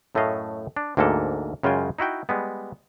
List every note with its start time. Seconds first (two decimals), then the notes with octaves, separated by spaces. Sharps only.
0.15 F#2 A2 A3 C#5 D#5 F5
0.77 D4
0.97 D2 G#2 A#3 D4 A4
1.63 F#2 C#3 G#3 F4 G5 G#5
1.99 D#4 E4 F#4 G5
2.29 G3 G#3 B3